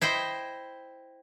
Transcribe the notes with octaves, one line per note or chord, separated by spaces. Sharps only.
E4 C5 D#5 G5